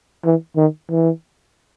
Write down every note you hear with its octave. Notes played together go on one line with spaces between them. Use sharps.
E3
D#3
E3